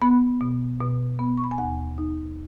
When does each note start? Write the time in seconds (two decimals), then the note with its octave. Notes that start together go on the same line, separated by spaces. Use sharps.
0.02 B3 B5
0.41 B2
0.80 B2
1.19 B3
1.37 C#6
1.44 B5
1.51 G#5
1.58 D#2 F#5
1.98 D#4